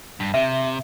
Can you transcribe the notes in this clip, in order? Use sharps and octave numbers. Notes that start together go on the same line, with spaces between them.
G2
C3 E5